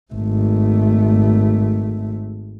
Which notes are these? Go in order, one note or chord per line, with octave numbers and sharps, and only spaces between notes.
G#1 A3